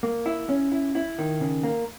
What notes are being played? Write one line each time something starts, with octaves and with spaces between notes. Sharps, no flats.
A#3
E4
C#4
E4
E4
D#3
C#3
A#3